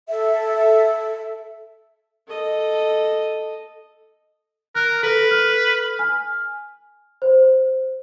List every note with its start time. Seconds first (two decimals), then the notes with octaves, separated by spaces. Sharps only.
0.09 A4 E5
2.28 A4 D#5
4.75 A#4 F#6
5.03 A4 B4
5.31 A4 F6
5.99 G#5 F6
7.22 C5